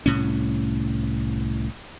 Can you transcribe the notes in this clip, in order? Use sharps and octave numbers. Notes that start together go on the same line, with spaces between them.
C2 A2 C#4